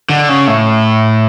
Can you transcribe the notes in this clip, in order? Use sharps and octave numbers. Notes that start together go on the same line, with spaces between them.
D3
C#3
A2